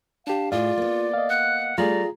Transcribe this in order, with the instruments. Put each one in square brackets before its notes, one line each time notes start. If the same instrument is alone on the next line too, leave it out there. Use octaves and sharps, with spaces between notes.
[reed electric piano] D4 G4 [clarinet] F5 [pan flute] A5
[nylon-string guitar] A2 G#4 [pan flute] F4 [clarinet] D5 [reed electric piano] F5
[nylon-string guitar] A#3 B3
[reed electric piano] D#5 F5
[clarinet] F#5 [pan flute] F#6
[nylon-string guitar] G3 A3 [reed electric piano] F4 G#4 [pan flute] D5 [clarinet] A#5